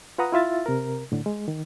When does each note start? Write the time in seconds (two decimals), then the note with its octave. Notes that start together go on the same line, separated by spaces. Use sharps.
0.18 F4 B4 F#5 A#5 D#6
0.32 E4 F4 E5 A6
0.66 C3 A#4
1.12 A2 D3
1.26 G#3
1.48 D#3